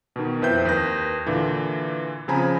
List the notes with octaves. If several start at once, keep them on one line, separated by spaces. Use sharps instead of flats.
B2 D#3
F2 E4 B4 C5 G5 G6
D#2 A#4 B4 A#6
A#2 D3 E3
C#3 F3 C4 G#5 A#5 B5